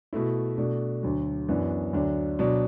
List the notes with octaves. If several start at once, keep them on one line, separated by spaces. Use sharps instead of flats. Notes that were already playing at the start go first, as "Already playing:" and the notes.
B2 A3 E4
B2 A3 D4
D2 D3 F#3
F#2 E3 B3 D4
D2 D3 F#3 D4
B2 F#3 D4